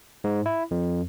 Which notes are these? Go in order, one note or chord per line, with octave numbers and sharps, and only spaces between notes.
G#2
E4
F2